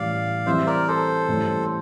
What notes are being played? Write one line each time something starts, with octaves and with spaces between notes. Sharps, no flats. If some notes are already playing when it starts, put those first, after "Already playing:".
Already playing: A1 A2 G3 D5 F5
E3 G3 C4 C5 E5
A#4 D5
A4 C5
A1 A2 G3